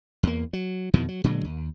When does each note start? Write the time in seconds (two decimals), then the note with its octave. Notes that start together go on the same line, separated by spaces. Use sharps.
0.23 E2 A#3
0.53 F#3
0.94 F2 B2 D#3 E3
1.08 F#3
1.24 A#2 D3 F#3 G#3
1.45 D#2